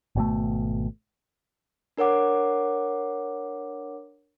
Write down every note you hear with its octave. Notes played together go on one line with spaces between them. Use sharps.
G#1 B2 A3
D4 A#4 C#5 F#5 D6